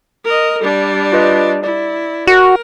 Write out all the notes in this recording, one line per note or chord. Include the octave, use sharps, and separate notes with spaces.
A#4 D#5
G3 D4
F4 B4 D#5
E4 D5
F#4 A#4